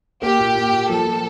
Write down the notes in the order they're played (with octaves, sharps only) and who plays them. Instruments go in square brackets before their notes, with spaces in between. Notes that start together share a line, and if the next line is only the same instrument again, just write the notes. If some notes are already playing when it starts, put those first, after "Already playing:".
[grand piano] A#3 [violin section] G4
[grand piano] A#2
A#2
A#2
[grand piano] F3 [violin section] A4
[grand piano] F3